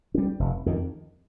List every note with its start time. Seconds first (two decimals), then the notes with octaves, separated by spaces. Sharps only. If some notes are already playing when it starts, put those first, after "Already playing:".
0.14 G3 C#4
0.40 F1
0.66 F2 D#3